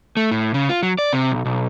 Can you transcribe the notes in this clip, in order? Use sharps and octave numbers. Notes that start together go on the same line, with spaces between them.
A3
A2
C#3
F4
F#3
D5
C3
B1
B1